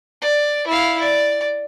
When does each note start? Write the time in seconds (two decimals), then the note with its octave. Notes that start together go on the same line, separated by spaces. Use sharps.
0.22 D5
0.67 E4 F5
1.01 D5